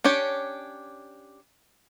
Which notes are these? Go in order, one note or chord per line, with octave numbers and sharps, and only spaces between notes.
C#4 D4 G4 C#5